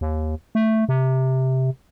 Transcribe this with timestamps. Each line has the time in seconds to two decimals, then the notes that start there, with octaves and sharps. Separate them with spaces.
0.01 D#2
0.55 A3
0.89 C3